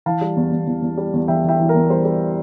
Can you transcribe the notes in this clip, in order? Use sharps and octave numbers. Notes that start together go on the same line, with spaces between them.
E3 F5 A5
G3
E2
E2
E2
E2
G3
E2
E3 E5 G5
E3 E5 G5
E3
A#4
E2
G3 C5
G3